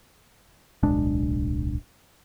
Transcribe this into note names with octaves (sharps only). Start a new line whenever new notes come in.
D1 B1 G#3 D4